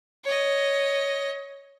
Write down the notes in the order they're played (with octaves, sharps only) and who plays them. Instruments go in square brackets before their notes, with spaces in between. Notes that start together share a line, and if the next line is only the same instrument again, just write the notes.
[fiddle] C#5 D#5